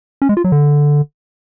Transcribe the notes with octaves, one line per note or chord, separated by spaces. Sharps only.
C#4
G#3
F4
F#3
D3